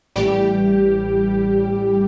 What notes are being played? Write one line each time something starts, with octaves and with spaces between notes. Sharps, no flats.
A1 A2 E3 G3 G4